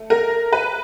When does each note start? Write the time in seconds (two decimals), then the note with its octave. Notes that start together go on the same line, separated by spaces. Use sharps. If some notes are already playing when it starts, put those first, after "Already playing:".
Already playing: A3
0.10 A#4
0.53 B4